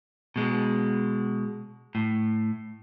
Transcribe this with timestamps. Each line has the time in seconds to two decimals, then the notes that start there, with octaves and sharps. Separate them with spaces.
0.36 B2 G#3
1.95 A2